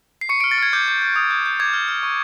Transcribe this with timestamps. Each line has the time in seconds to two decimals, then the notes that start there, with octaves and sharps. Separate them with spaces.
0.21 C7
0.29 C#6 C#7
0.40 D7
0.44 F6
0.51 A6
0.58 F6 G#6
0.73 D6 G6
0.88 G6
1.02 G6
1.16 D#6
1.31 G6
1.46 G6
1.60 D6 G#6
1.73 F6
1.88 F6
2.03 C#6